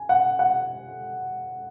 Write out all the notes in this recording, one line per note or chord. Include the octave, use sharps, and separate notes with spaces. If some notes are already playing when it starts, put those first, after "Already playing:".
Already playing: G#5
F#5
F#5